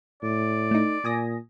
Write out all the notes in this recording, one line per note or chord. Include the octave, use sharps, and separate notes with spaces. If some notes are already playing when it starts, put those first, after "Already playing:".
A2 D5
A3 D#4
A#2 G#5 D#6 A#6